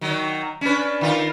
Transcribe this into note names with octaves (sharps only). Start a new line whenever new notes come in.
D#3 F#3
C#4 D4 B4
D#3 F4 A#4